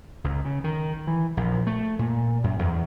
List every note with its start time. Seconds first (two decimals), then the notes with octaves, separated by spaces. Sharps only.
0.24 C#2
0.45 C#3
0.64 D#3
1.07 E3
1.37 A#1
1.67 A3
1.99 A#2
2.44 F#2
2.59 E2